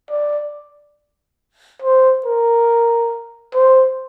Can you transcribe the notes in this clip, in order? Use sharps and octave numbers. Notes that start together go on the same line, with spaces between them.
D5
C5
A#4
C5